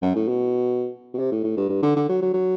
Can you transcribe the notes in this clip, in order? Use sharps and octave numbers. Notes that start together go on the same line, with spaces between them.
F#2
A2
B2
B2
C3
A2
A2
G2
G2
D3
D3
F#3
F#3
F#3